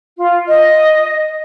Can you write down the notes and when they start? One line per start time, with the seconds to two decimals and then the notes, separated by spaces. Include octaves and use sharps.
0.18 F4
0.49 D#5